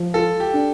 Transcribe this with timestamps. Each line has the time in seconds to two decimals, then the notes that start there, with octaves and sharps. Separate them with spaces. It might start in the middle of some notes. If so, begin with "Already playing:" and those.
Already playing: F3
0.13 F4 A4
0.40 G4
0.53 D4